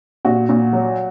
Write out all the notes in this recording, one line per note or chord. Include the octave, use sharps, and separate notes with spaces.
A#2 F#4
A#2
F#3